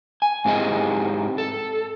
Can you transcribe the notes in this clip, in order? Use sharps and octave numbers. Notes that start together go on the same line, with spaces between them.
G#5
G#2 C4 E4 G4 G#4 D#5
A4